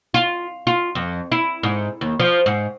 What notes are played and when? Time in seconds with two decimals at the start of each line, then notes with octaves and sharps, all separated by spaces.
0.14 F4
0.67 F4
0.95 F2
1.32 E4
1.63 G#2
2.01 D#2
2.19 F3
2.46 G#2